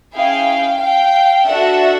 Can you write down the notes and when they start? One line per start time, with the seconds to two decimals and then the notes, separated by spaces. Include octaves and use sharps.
0.15 C#4 E4 G#4 F5 G5
0.80 F5 G5
1.46 D4 F#4 A4 E5 F#5